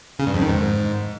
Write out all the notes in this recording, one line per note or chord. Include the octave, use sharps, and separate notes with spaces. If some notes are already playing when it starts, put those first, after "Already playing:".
C#3
G2
F2
D#3
G#2